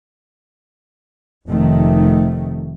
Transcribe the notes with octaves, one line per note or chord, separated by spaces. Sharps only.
F1 C3 D#3 A3